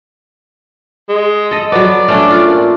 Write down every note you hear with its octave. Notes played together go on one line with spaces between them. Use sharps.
G#3
A4 D#5
F#3 B3 D5
A3 C#4 D4
F4
A#2